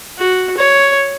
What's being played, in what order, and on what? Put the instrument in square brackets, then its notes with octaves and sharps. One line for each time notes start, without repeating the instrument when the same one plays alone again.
[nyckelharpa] F#4
C#5